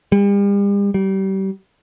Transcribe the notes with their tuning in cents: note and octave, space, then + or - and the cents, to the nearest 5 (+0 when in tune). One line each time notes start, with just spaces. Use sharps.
G3 +40
G3 -30